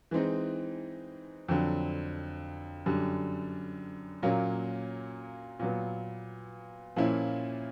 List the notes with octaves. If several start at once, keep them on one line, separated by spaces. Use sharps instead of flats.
E3 G#3 C4 D#4
F2 D3 F#3
F#2 D3 G3
A#2 F#3 A#3 C#4
A#2 F#3 B3
A#2 F3 A#3 C#4 E4